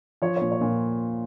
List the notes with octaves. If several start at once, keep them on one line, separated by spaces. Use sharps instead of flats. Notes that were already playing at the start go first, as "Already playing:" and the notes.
F3 C#5
A#2 C#5
C#5
A#2